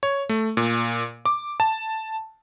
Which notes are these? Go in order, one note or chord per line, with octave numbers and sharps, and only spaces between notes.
C#5
A3
A#2
D6
A5